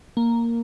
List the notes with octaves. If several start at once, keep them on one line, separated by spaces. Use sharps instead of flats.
A#3